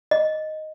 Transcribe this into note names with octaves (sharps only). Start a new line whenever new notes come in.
D#5